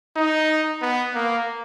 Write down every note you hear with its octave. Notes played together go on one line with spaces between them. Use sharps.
D#4
B3
A#3